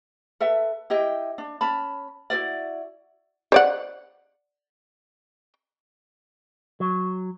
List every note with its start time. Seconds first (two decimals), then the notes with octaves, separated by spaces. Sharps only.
0.40 A4 B4 E5
0.90 E4 G4 D#5 G5
1.38 D4
1.61 C#4 A5 B5
2.30 E4 F#4 B4 D5
3.52 C5 D5 F#5
6.80 F#3